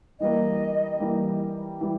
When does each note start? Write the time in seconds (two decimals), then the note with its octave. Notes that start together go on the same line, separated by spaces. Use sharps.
0.20 E3 G3 A#3 D#5
1.00 E3 G3 A#3
1.81 E3 G3